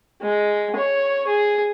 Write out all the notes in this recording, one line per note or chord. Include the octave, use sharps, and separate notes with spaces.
G#3
C#5
G#4